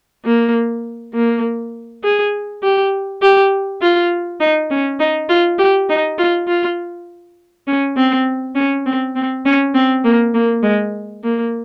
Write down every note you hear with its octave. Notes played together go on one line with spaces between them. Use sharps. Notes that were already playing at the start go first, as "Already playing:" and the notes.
A#3
A#3
G#4
G4
G4
F4
D#4
C#4
D#4
F4
G4
D#4
F4
F4
C#4
C4
C#4
C4
C4
C#4
C4
A#3
A#3
G#3
A#3